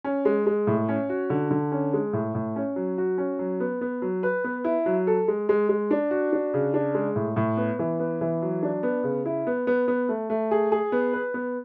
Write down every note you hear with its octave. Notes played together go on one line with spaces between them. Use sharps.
C#4
G#3
G#3
A2
C#4
F#4
D3
D3
C#4
G#3
A2
A2
C#4
F#3
F#4
C#4
F#3
B3
B3
F#3
B4
B3
E4
F#3
A4
G#3
G#3
G#3
D4
F#4
D4
C#3
D4
G#3
A2
A2
B3
E3
B3
E3
F#3
D4
B3
C#3
E4
B3
B3
B3
A3
A3
G#4
G#4
B3
B4
B3